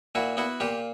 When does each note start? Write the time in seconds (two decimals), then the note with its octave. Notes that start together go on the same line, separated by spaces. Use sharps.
0.15 A#2 E4 F#4
0.37 B3 E4 F#4
0.60 A#2 F4 G4